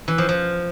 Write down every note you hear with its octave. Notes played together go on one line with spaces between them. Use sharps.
E3
F3
F3